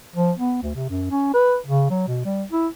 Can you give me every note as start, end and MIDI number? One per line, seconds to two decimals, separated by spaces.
0.16 0.32 53
0.38 0.58 59
0.62 0.70 38
0.75 0.88 48
0.89 1.10 42
1.11 1.31 61
1.34 1.57 71
1.66 1.90 49
1.90 2.06 54
2.07 2.22 47
2.25 2.44 55
2.52 2.68 64